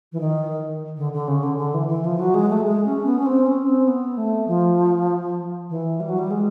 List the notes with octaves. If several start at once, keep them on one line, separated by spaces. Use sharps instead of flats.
E3
D#3
D3
D3
C#3
D3
D3
E3
E3
F3
F#3
G#3
A3
G#3
C#4
B3
C#4
C4
C#4
C4
B3
A3
F3
E3
G3
F#3
G3
G#3